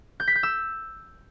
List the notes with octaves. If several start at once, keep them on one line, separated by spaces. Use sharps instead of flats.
G6
B6
G6
E6